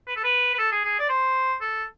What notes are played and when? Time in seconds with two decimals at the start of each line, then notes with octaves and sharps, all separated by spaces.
0.07 B4
0.16 A4
0.24 B4
0.54 B4
0.59 A4
0.72 G#4
0.84 G#4
1.00 D5
1.09 C5
1.61 A4